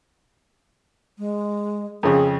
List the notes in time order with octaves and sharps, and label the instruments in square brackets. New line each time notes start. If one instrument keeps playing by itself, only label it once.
[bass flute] G#3
[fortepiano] F2 C#3 [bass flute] G#4